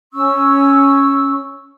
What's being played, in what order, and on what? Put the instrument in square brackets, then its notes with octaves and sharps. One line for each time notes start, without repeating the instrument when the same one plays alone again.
[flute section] C#4 C#6 E6